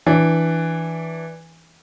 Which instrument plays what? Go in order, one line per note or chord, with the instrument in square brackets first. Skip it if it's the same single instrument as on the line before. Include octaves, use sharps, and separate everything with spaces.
[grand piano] E3 D4